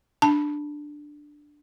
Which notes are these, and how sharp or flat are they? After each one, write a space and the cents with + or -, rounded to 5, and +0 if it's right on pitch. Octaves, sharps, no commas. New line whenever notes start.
D4 +5 A5 +0